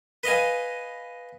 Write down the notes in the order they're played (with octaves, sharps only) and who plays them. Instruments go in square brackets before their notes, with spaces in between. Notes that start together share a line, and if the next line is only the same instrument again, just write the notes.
[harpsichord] B4 D#5 F5 G#5